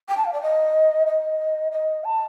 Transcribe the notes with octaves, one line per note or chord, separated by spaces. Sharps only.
G5
A5
F5
D5
D#5
D#5
D#5
A5